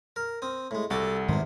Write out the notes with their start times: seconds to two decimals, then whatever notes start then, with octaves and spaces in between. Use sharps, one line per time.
0.16 A#4
0.42 C4 D#6
0.71 A2 G#3
0.90 C2 F#4 A4 A5 D6
1.29 E2 G#2 C3 D#3 G#3